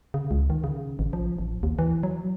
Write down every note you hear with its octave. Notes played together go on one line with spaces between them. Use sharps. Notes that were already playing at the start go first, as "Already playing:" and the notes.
C#3
C#2
D#3
C#3
A1
F3
A1
D#2
E3
F#3